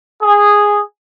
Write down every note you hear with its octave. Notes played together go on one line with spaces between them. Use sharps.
G#4